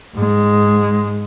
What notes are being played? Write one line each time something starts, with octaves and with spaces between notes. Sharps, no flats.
G#2 G#3